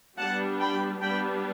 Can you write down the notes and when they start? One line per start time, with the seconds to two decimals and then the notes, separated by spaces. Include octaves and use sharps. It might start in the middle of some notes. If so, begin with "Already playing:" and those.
0.18 G3 B3 D4 F#5 A5
0.60 G5 B5
1.01 G3 B3 D4 G5 B5